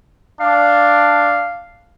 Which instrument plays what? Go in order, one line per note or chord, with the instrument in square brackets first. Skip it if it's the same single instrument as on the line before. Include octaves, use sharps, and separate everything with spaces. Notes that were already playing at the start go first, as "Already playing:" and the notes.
[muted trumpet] D4 [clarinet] F5